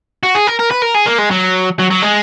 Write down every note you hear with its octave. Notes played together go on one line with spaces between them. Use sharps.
F#4
G#4
A#4
A#4
B4
A#4
G#4
A#3
G#3
F#3
F#3
F#3
G#3